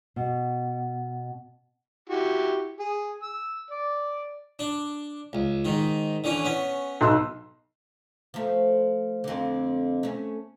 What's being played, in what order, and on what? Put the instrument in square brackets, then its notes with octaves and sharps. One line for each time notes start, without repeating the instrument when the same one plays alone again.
[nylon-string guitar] B2
[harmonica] E4 F#4 G4
G#4
E6
D5
[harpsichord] D4
C#2
G#2 D#3
D3 E3 C#4
B3 C#4
[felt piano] B1 C6 E6
[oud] F3 A3
F2 D3
A3 C#4